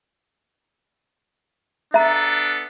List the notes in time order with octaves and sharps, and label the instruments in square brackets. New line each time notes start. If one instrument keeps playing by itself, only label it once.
[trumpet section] B3 D4 A4 [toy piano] E5 A#5